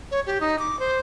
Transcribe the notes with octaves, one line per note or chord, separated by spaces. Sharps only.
C#5
G4
D#4
D6
C5